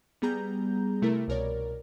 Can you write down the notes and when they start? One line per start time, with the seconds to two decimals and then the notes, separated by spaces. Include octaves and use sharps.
0.22 G3 B3 G#4 A#5 G6
1.02 C3 A3 E4 A#4
1.28 C2 B2 A#4 C#5 D5